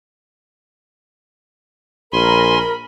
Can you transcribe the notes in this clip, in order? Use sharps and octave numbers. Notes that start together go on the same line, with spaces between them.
A#1 A#4 G#5 B5 C6